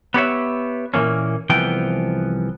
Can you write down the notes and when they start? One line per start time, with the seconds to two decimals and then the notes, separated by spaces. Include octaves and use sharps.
0.14 B3 G4 C#5 E5
0.94 A#2 E3 A#3 C#4
1.50 C2 E3 F3 B3 G5